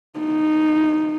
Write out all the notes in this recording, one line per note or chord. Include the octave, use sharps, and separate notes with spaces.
D#4